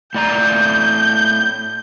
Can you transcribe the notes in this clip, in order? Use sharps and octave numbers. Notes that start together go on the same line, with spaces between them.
A2 D5 A#5 G6